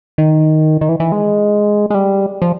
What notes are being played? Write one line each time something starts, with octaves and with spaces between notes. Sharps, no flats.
D#3
D#3
E3
E3
G#3
G#3
G3
F3